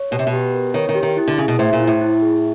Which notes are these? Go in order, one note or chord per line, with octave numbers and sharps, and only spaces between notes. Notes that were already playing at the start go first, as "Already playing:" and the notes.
Already playing: C#5
B2 G4
C3
B2
G4
A#4
D#3 C#5
D#3
G4
D#3
E4
D3
C#3 G#4
B2
A2 C5
A#2
E4
A2
E4
G#4